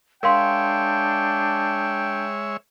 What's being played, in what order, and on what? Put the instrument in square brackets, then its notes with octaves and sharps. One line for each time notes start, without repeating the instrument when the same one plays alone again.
[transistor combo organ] G#3 C#5 E5 [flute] D4 [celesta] A#4 F5 C6 [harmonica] G5